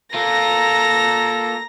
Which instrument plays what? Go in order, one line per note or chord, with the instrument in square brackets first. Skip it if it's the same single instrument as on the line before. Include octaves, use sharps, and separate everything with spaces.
[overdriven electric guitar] A#3 F4 [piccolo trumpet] A4 [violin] A#5 A#6